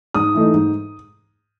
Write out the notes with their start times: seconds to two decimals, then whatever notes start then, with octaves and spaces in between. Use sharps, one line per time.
0.14 G#2 D#6
0.35 E3 A3 D#4
0.54 G#2